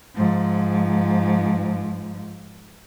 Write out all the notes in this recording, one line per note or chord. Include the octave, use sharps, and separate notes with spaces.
G#2 F3